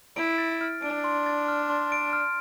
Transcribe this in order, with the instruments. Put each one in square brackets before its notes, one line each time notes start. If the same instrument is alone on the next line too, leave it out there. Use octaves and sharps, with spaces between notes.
[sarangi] E4 [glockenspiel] D7
[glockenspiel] A6
F6
[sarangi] D4 [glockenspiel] D7
[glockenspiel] C6
A6
F6
C6
D7
F6